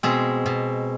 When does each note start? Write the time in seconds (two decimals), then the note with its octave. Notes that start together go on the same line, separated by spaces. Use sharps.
0.03 B2 G#3 C4
0.46 B2